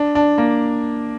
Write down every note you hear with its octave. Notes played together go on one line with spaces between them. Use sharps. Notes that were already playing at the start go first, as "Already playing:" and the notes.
Already playing: D4
D4
A#3